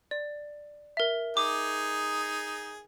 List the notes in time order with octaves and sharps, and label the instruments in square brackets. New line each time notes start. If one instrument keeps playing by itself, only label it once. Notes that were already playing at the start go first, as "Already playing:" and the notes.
[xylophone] D5
A#4 E5
[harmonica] D#4 G#4 [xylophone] D6